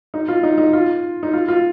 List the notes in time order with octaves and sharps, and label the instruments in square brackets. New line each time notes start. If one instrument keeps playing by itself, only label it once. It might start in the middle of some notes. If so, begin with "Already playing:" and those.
[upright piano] D#4
F4
D#4
D#4
F4
D#4
F4
F4